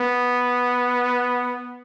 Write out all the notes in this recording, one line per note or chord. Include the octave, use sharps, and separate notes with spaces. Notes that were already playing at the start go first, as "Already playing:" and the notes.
Already playing: B3